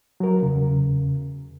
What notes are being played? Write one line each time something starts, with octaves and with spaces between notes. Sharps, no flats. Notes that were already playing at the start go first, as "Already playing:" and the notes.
F#3 A#4
E2 C#3